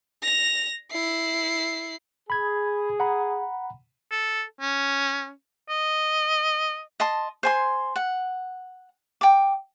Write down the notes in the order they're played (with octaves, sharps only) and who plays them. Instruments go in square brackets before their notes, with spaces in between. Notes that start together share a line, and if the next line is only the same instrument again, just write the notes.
[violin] A#6 F7
E4 C7
[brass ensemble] G#4 [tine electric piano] B5 G#6
[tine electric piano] F#5 A#5 B5
[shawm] A4
C#4
D#5
[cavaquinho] D#5 A5 C6
C5 G#5 C6
F#5
G5 D6